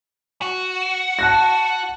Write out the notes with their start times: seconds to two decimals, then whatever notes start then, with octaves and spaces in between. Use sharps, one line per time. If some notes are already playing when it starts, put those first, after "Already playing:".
0.42 F#4
1.19 A5 F#6 A#6